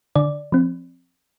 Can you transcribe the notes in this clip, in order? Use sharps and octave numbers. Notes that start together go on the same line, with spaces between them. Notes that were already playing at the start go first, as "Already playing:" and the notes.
D3 D5
F3 C4